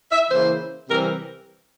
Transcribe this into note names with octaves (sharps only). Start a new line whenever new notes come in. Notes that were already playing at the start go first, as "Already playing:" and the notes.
E5
C#3 E3 A#3 E4 C5
C3 E3 G3 C4 A#4